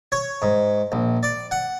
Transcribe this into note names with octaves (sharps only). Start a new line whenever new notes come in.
C#5
G#2
A#1
D5
F#5